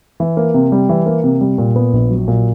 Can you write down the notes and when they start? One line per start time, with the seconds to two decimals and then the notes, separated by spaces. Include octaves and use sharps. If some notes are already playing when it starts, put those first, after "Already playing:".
0.20 E3
0.37 A#3
0.54 C3
0.72 G3
0.89 E3
1.06 A#3
1.24 C3
1.41 G3
1.58 A#2
1.76 B3
1.93 A#1
2.10 F#3
2.28 A#2